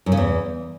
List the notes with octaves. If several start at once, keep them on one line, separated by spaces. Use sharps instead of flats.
F#2
C#3
E2